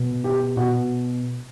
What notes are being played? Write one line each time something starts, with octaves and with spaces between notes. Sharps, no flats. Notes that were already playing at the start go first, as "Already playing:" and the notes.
Already playing: B2
G4
B2 F#4